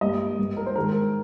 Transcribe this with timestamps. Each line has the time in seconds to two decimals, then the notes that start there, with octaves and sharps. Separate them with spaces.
0.01 G2 G3 A#3 D#5
0.38 G2 G3 A#3
0.57 A#4
0.66 C5
0.76 G#2 D#3 G#3 A#4